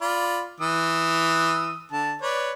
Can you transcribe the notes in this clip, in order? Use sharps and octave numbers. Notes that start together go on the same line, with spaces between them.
F4 D5 B5
E3 D#6 E6
D3 A5
B4 C#5 D5